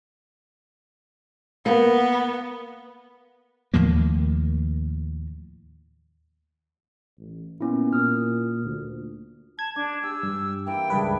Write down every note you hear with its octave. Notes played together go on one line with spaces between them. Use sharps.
A#3 B3
D#2 A2 F3 A#3
A1
A#2 B3 C#4 E4
A#2 D#6 F6
D2
A5 G#6
D4 A5 D6
G4 G#5 E6
G2
E3 A#3 G5
C#2 G2 D4 G#4 B4 E5